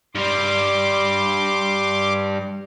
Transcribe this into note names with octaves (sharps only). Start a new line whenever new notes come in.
G2 G3 C6 D6